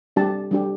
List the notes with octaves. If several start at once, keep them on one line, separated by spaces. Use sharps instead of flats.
G3 D4 G4 A5
G3 D4 G4